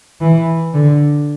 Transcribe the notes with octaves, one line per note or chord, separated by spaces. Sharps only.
E3
D3